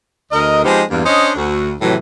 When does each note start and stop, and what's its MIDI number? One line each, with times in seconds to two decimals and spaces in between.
0.32 0.62 38
0.32 0.62 70
0.32 0.62 75
0.63 0.81 53
0.63 0.81 56
0.63 0.81 59
0.63 0.81 60
0.63 0.81 63
0.63 0.81 67
0.90 1.03 40
0.90 1.03 43
0.90 1.03 58
1.06 1.31 61
1.06 1.31 62
1.06 1.31 72
1.06 1.31 75
1.36 1.72 38
1.36 1.72 66
1.81 1.95 45
1.81 1.95 48
1.81 1.95 51
1.81 1.95 52
1.81 1.95 54